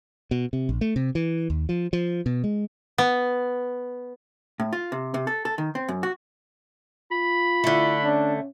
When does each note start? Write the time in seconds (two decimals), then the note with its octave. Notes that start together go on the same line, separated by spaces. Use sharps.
0.31 B2
0.53 C3
0.69 A#1
0.81 A3
0.96 C3
1.15 E3
1.50 D#2
1.69 F3
1.93 F3
2.26 B2
2.44 G#3
2.98 B3
4.60 A2
4.73 F4
4.92 C3
5.14 C3
5.27 A4
5.45 A4
5.58 D#3
5.75 C4
5.88 F#2
6.03 F#4
7.11 F4 B5
7.64 D3 A3 E4
8.04 C#4 D4